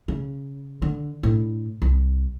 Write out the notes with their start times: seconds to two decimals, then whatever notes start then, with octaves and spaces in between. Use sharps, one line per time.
0.08 C#3
0.82 D3
1.23 A2 D4
1.82 C2